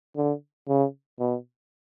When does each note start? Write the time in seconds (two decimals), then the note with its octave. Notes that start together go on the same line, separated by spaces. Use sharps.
0.16 D3
0.68 C#3
1.20 B2